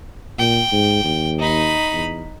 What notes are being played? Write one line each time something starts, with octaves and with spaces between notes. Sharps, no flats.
A#2 G5
G#2
D#2
D#4 B5
E2